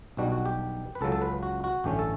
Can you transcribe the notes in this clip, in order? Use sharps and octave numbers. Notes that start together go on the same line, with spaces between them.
B1 B2 G3 D4 F#4
F#4
G4
B4
C#2 C#3 F#3 A4
A4
B4
F#4
F#4
A1 G2 D3 A3 C#4 G4
A4